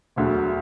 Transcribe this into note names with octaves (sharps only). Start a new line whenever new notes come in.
E1 D2 D3 F#3